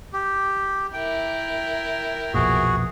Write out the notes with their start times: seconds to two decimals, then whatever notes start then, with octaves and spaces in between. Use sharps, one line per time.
0.13 G4
0.94 E4 A#4 G5
2.34 B1 F2 A#2 F#4 G#4